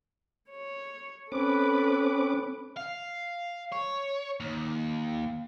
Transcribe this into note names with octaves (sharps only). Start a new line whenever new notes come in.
C#5
C4 C#4 A4 B4 D6
F5
C#5
D#2